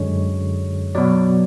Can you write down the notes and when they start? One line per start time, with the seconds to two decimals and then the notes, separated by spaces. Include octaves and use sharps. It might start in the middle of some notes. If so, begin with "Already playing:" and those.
Already playing: F#2 D3 G#3 C#5
0.95 B2 F#3 D5